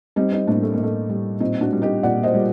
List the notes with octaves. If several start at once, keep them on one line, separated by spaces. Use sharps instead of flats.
G3 C4 D#4
C4 D#4
A2 A#3 D4
A3
A2 A#3
A3
G3
A#2 C4 D#4
D4 F#4
G3
D#4 G4
A#2 D5 F#5
C5 D#5
G3